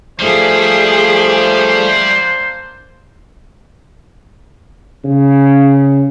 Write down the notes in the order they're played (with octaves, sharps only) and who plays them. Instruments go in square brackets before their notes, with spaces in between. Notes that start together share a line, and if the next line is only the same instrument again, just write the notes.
[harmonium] F3 A3 [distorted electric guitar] G3 [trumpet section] A#3 D4 C5 [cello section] G#4
[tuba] C#3